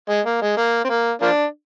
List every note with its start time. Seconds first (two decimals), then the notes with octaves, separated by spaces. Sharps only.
0.09 G#3
0.26 A#3
0.42 G#3
0.57 A#3
0.85 C4
0.89 A#3
1.22 F3 A#3 D4